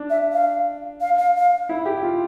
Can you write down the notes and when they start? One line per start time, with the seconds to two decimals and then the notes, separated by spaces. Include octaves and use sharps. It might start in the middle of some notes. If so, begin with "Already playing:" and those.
Already playing: D4
0.10 E5
0.33 F5
1.01 F5
1.18 F5
1.36 F5
1.69 E4
1.85 G4
2.03 F4